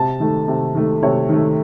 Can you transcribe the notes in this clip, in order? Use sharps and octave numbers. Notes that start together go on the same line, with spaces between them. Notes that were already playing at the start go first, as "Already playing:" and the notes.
Already playing: C3 A5
D#3 A3
C3
D#3 A3
C3 C#5
D#3 A3